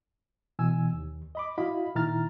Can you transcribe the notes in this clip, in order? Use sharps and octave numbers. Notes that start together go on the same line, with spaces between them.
B2 E3 G#5 E6
D#2
D#5 B5 D6
E4 F#4 D#5 F5 B5
A#2 D#3 E4 A#5 F6 A6